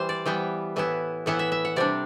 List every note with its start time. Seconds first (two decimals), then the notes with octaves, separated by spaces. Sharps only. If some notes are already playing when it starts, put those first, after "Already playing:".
Already playing: E3 G3 C5
0.09 D5
0.26 E3 G3 B3 G5
0.76 A2 E3 B3 E4
1.26 A2 E3 B3 E4 F#5
1.39 E5
1.52 E5
1.65 F#5
1.76 C3 G3 D4 D5